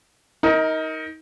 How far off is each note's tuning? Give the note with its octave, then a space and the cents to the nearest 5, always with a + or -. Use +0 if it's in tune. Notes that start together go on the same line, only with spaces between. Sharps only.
D#4 +25 A#4 +0